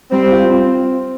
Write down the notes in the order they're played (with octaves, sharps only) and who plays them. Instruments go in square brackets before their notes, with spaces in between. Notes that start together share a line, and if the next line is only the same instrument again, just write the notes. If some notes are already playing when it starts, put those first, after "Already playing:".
[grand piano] G3 [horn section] C4
[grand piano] F4
C4